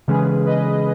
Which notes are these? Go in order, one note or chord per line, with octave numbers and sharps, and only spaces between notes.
C#3 E3 G#3 C#4 G#4 B4
B4 D#5